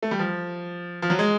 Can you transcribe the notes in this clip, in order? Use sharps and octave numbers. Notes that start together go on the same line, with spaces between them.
A3
G3
F3
F3
F#3
G#3